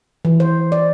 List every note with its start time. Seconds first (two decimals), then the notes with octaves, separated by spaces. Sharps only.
0.25 E3
0.40 C5
0.72 D5